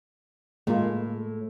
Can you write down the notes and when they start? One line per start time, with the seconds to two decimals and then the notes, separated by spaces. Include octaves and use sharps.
0.67 A2 G#3 A#3 F4